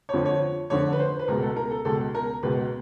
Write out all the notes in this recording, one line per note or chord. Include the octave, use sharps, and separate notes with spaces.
C#5
F2 D3 F3
C#5
F2 D3 F3 C#5
B4
C5
B4
C#2 B2 A#4
A4
A#4
A4
C#2 B2 A4
A#4
C#2 B2 B4